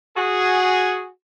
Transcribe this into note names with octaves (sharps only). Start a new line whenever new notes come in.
F#4 G#4